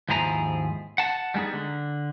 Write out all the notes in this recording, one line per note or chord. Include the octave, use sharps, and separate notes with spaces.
D#2 G#2 F3 E4 G#4 A#5
F#5 A5
G3 G#3 B3 D#4 G#4
D3